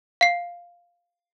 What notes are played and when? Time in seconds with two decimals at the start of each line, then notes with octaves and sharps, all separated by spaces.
0.21 F5 C7